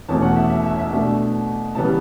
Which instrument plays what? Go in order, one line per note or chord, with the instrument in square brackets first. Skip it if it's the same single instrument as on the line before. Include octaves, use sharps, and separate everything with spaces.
[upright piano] E2 B2 A3 C#4 A5
F#5
E5
E5
E5
E5
B2 A3 D4
C#3 E3 G3 B3 A5